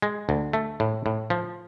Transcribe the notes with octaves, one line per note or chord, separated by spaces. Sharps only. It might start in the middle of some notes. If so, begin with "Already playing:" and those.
G#3
D2
A3
A2
A2
F3